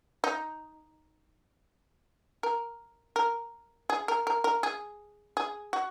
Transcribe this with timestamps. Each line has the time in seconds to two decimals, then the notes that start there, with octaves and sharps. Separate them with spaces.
0.24 D#4
2.43 A#4
3.16 A#4
3.90 G#4
4.08 A#4
4.27 A#4
4.44 A#4
4.63 G#4
5.37 G#4
5.73 F#4